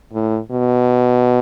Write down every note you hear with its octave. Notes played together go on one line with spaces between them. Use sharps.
A2
B2